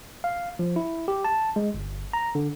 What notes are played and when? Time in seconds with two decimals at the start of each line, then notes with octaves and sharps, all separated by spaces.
0.24 F5
0.59 F3
0.76 E4
1.08 G4
1.25 A5
1.56 G#3
1.74 G1
2.13 A#5
2.35 D3